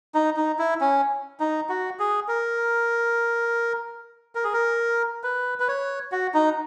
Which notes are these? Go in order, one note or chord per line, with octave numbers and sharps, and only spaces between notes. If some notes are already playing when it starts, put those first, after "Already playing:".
D#4
D#4
E4
C#4
D#4
F#4
G#4
A#4
A#4
G#4
A#4
B4
B4
C#5
F#4
D#4